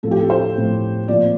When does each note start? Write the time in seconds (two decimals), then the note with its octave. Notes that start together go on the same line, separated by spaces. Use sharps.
0.03 A2 F3 C4 A4
0.11 G4
0.19 A4
0.30 C5
0.56 A2 F3 C4
1.08 A#2 F3 C4 D5